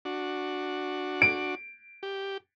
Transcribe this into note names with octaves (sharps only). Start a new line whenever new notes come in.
D4 F#4
D7
G4